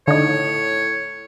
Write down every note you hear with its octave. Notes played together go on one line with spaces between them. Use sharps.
A2 D3 D#4 C#5